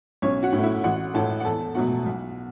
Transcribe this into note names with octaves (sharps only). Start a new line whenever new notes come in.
B1 C#4 C#5
F#4 F#5
A2
A3
E4 E5
A1 F#4 F#5
A2 E3 A3 A4 A5
F#5
E2 A4 A5
B2 F#3 A3 F#4 F#5
B1